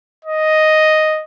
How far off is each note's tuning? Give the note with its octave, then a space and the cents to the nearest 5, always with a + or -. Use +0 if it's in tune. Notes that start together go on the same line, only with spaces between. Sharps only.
D#5 +0